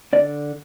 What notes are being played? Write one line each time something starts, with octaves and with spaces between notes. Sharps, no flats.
D3 D5